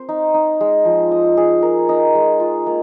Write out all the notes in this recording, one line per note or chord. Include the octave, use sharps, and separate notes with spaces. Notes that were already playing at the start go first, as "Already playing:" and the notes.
Already playing: C4 C5
D#4
D#4
G#3
F3
D#5
G#4
A#4
D#4
G#3
F4
A#3